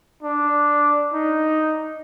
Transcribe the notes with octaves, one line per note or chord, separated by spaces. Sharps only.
D4
D#4